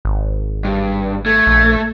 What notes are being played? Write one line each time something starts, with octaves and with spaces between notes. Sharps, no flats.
G#1
G2
A3 G#6
A#1